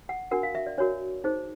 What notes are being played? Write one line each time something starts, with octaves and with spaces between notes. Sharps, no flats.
F#5
D4 F#4 A#4 F#5
F5
E5
D5
D4 F#4 A#4 C#5
D#4 G#4 C5